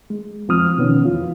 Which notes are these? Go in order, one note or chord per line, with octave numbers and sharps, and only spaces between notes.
G#3
E2 F3 C4 D#6 F6
B2 D#3 B3 C#4
E2 E3 F4